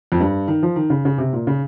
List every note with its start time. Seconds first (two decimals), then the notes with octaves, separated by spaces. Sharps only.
0.12 F2
0.20 G2
0.48 D#3
0.63 F3
0.76 D#3
0.90 C#3
1.05 C#3
1.18 C3
1.33 A#2
1.47 C#3